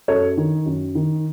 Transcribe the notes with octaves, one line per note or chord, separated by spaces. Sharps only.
F#2 A4 C#5
D#3
F#2
D#3